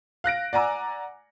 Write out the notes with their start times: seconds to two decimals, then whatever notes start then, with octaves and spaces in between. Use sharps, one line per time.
0.24 F5 F#6 A#6 D7
0.53 D5 F#5 G#5 A#5 D6 E6